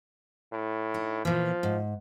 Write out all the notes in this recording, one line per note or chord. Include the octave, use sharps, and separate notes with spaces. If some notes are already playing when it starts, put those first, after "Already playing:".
A2
D#4
A#2 E3 F3
G#2